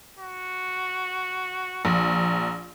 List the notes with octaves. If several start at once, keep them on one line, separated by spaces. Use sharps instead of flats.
F#4
A#1 A#5